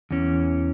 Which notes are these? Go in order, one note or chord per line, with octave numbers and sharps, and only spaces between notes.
E2 E3 C#4